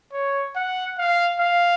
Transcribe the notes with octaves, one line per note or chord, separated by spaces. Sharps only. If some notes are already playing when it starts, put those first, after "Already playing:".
C#5
F#5
F5
F5